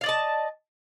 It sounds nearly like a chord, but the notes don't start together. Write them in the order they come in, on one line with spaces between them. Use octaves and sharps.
F5 D5 D#5 A5